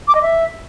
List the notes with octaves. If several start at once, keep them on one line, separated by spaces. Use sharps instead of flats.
D6
D#5
E5